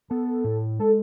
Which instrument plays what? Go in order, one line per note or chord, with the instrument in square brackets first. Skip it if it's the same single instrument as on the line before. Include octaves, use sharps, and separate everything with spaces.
[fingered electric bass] B3 [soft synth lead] A4
[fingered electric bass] A2
[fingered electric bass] G#3 [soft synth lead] A4